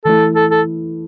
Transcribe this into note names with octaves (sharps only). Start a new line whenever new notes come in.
E3 A3 E4 A4
A4
A4